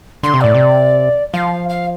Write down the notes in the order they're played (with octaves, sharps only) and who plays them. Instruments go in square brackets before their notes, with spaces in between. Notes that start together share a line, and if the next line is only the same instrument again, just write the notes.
[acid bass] D3 [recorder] C6
[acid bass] C3
[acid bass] A2 [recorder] D5
[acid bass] C3
[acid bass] F3 [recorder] F5
[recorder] F5